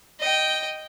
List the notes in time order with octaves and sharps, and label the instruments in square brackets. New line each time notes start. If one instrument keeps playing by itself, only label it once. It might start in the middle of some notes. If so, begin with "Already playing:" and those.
[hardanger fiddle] D#5 G5